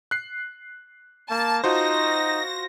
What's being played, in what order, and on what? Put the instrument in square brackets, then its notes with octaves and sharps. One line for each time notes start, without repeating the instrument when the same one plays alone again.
[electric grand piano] F#6 C7
[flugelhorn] A#3 [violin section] A5
[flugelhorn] D#4 [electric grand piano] F4 F#4 C5 [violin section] A#6